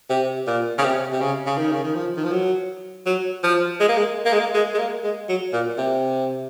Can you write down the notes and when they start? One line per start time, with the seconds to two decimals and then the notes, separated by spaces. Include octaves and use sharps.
0.10 C3
0.47 A#2
0.78 C#3
0.84 C3
1.13 C3
1.21 C#3
1.47 C#3
1.58 D#3
1.72 C#3
1.84 D#3
1.95 F3
2.17 D#3
2.24 F3
2.32 F#3
3.06 F#3
3.43 F3
3.80 G#3
3.89 A#3
3.98 G#3
4.25 A#3
4.33 G#3
4.40 A#3
4.54 G#3
4.74 G#3
4.79 A#3
5.04 G#3
5.29 F#3
5.53 A#2
5.78 C3